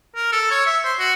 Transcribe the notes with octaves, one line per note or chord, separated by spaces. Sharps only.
A#4
A4
C#5
E5
C5
F#4